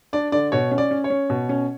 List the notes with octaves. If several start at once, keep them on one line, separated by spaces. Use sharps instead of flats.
D4 D5
D3 D5
B2 C#5
C#4
D5
C#4
C#5
C#4
B2
C#4